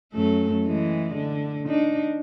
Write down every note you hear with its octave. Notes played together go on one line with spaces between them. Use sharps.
F#2 A3 A4
E3 G#3
D3
D4 D#4